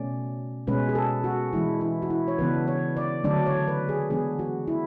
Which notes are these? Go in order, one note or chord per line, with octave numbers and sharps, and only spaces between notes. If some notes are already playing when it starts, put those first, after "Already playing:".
Already playing: B2 A3 C#4 D5
B2 G#3 C#4 B4
G#4
A4
F#4
E3 G#3 D4 E4
E4
F#4
E4
C#5
C#3 E3 B3 D4 B4
C#5
D5
D3 F#3 A3 D4 D5
C#5
B4
G#4
E3 G#3 B3 D4 G#4
F#4
E4